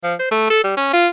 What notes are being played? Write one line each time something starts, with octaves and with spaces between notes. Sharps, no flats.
F3
C5
A3
A4
G3
C#4
F4